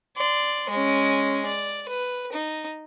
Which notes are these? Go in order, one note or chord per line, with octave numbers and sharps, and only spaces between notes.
D5 C6
G#3 C#4
D5
B4
D#4